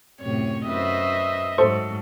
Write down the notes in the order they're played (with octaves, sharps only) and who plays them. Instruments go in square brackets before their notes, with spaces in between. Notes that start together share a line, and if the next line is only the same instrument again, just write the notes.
[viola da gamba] F#2 A2 C3 [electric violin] C#5
[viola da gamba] F#2 B4 C5 [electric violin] D#5 E5
[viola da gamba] G#2 F#3 [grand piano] A4 [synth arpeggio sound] C5